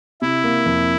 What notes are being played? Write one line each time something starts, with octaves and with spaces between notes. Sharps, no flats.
C3 E4
A#3
F2